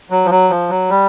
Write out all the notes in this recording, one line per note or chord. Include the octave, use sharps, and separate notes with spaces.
F#3
F3
F#3
F3
F#3
G3